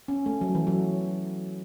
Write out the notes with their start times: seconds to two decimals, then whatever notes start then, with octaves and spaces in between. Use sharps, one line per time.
0.08 C#4
0.26 A3
0.41 F#3
0.55 E3
0.67 F#3